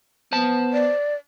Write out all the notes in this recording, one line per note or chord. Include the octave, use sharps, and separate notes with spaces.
B3 C5 A5
D5